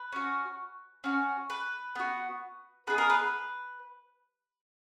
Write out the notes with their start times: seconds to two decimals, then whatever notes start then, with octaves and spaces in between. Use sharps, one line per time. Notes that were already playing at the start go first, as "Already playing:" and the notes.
Already playing: B4
0.13 C#4 F#4
1.04 C#4 F#4
1.50 B4
1.95 B3 F#4
2.87 B3 D#4 G#4 B4
2.98 A#4
3.10 B4